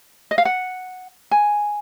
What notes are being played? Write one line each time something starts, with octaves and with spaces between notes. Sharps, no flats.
D#5
F5
F#5
G#5